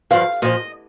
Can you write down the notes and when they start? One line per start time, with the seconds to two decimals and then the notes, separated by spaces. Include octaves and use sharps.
0.11 G2 D3 F3 F5
0.42 A#2 F3 D#5